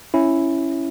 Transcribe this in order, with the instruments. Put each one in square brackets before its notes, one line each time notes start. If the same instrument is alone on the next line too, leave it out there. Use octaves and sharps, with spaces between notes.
[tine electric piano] C#4 E4